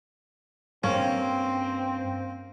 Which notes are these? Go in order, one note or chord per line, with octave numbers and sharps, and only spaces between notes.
G2 A#3 C4 C#4